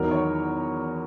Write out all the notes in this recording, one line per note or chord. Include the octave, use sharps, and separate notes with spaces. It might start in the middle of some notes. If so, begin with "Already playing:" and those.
Already playing: E2 D#3 F#3 A#4
C#5